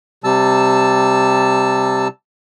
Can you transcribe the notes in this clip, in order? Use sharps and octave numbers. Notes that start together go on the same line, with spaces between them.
C3 G3 A5 E6